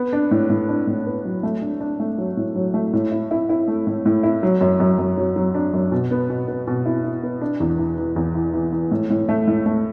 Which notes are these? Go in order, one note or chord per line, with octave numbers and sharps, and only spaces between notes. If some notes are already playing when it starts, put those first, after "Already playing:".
Already playing: B3
D4
A2
A2
D4
A2
B3
F#3
A3
D4
D4
A3
F#3
A2
F#3
A3
A2
E4
E4
E4
A3
A2
A2
E4
F#3
F#2
F#2
F#2
F#3
F#3
D4
F#2
B2
B3
B2
B3
B2
E4
E4
B3
D4
E2
E3
E3
E2
E3
E3
E3
A2
A2
A3
A2
A3